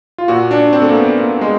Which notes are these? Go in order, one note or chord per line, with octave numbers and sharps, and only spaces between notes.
F4
A#2 F#4
D4
C4
A3
A#3
B3
A#3
G#3